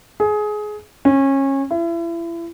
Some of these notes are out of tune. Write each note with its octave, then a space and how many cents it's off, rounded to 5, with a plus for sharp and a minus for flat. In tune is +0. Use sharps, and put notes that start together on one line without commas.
G#4 +20
C#4 -25
E4 +35